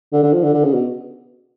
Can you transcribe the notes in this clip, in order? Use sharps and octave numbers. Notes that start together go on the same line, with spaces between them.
D3
D3
F3
D3
D3
C#3
B2